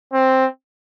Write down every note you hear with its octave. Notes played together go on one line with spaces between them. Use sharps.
C4